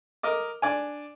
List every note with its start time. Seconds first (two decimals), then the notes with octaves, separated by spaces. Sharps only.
0.23 A#4 D#5 D6
0.62 D4 D5 G#5